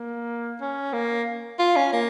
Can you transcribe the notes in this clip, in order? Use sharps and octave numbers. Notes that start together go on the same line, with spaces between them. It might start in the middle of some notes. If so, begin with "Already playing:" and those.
Already playing: A#3
C#4
A#3
F4
C#4
A#3